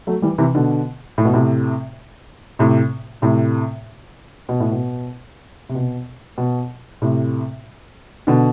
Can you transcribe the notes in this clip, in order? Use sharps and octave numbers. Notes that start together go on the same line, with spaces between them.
F#3 A3
E3 G3
C3 E3
B2 D3
A2
B2
A2 C3
A2 C3
A2 C3
B2
A2
B2
C3
B2
B2
A2 C3
B2 D3